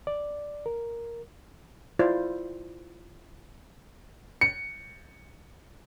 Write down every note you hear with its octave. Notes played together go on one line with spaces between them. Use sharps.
D5
A#4
E4 F4 C5 D5
C#7